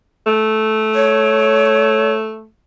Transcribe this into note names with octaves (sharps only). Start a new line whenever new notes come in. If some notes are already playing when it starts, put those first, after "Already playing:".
A3
C#5